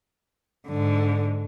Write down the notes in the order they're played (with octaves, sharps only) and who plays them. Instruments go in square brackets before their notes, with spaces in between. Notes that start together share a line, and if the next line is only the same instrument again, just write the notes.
[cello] G#2 D3